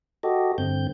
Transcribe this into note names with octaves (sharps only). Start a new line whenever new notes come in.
F#4 G4 A4 D#5
G2 D3 C4 G6